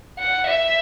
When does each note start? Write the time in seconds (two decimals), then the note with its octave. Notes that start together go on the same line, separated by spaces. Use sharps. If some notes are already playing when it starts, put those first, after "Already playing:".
0.19 F#5
0.47 E5